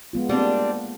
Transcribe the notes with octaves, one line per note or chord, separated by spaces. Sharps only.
G#3 B3 F4
G3 A#3 C4 D4